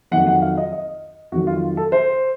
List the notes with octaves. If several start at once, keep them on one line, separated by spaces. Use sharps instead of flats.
F2 D#3 F#3 F#5
F#5
F5
D#5
D#5
F2 D#3 F#3 F#4
F4
A4
C5